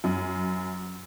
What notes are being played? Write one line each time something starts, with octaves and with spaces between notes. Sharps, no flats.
F#2